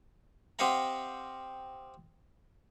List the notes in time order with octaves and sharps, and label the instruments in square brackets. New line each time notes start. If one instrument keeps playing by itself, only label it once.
[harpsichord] C4 G4 D#5 F5 F#5 A#5